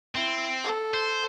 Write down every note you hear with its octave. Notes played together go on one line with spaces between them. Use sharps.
C4 E4
A4
C5